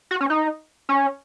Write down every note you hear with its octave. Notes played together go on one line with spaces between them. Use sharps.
F#4
C#4
D#4
C#4